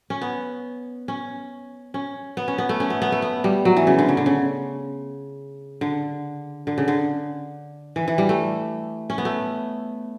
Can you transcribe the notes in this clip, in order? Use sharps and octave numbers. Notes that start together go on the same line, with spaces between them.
C#4
B3
C#4
C#4
B3
C#4
B3
A3
C#4
B3
B3
A3
B3
G3
F#3
E3
C#3
D3
C#3
D3
C#3
D3
D3
C#3
D3
E3
E3
G3
A3
C#4
B3
A3